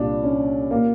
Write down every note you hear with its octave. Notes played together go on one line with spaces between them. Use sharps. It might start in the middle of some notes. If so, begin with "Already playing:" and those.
Already playing: C2 A#2 D4
C#4
A#2 A#3